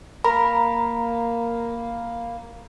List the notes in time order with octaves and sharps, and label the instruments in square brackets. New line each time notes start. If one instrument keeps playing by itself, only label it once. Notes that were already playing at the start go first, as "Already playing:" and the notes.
[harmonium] A#3 [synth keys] A#4 [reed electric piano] A#5 [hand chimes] B5